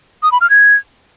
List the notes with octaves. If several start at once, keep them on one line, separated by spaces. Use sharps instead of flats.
D#6
B5
F6
G#6